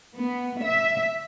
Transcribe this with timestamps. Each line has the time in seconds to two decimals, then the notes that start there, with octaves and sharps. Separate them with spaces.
0.15 B3
0.61 E5